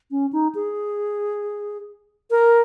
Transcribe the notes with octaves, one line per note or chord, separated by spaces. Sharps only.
C#4
D#4
G#4
A#4